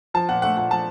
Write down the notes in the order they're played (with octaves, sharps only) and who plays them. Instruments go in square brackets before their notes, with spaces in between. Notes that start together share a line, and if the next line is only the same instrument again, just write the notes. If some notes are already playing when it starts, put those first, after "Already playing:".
[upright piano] F3 A5
A#2 F#5
A3 F#5
A#2 F#5
F3 A5